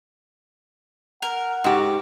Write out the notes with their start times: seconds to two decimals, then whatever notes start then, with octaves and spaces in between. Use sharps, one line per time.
1.22 A#4 F#5
1.64 G#2 F#4 G4